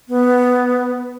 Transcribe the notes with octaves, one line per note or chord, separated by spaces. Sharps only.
B3